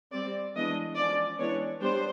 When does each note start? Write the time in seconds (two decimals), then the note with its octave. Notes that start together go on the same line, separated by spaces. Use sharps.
0.13 G3 C4 D5
0.55 E3 G#3 B3 D4 D#5
0.97 F3 G#3 C#4 D5
1.39 E3 G#3 B3 D4 C#5
1.81 G3 B3 D4 C5